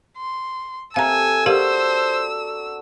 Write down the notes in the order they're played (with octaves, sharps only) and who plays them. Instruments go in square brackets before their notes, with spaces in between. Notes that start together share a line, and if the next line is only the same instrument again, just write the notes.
[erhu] C6
[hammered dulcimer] C3 A4 A#4 [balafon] F5 A#5 [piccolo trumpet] G#5 [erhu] E6
[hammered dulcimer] D4 F#4 [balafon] G4 A#4 F5 [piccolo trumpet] C5